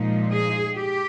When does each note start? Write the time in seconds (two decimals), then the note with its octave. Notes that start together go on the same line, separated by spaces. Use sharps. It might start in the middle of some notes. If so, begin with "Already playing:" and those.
Already playing: A#2 F3 G#3 D#4
0.32 G#4
0.76 G4